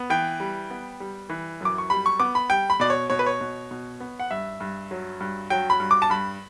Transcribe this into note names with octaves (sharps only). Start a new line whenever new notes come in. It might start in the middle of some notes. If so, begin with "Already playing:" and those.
Already playing: B3
E3 G5
G3
B3
G3
E3
F#2 D6
C#6
G3 B5
C#6
B3 D6
B5
G3 G5
B5
B2 D5
C#5
B2 C#5
B4
C#5
B2
B2
B3
F#5
G2 E5
G2
F#3
G2
F#3 G5
B5
G2
D6
A5
G2 B5